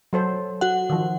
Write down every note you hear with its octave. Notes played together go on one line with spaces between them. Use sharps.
F#3 A4 C5
F#4 F#5
D#3 F3